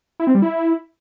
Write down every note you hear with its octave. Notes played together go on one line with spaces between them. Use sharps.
E4
C4
G3
E4